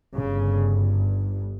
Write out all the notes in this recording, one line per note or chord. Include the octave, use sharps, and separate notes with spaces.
G1 G2 C#3